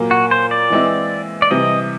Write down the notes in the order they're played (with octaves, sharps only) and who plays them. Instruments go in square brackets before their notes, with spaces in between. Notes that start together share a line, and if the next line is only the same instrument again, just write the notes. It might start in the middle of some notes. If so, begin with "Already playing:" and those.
Already playing: [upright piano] A#2 F#3 A#3
[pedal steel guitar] F#4
C5
D5
[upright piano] E3 G#3 C4 E4
[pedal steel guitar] D5
[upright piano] C3 E3 G3 [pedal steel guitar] D#5